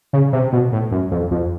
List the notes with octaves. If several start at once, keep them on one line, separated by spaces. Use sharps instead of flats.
C#3
C3
B2
A2
F#2
F2
F2